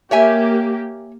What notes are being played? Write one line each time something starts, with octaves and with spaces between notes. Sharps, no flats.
A#3 G4 C#5 E5 G#5